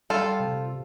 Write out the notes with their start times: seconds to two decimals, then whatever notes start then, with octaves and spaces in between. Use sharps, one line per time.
0.10 G3 F4 A4
0.40 C3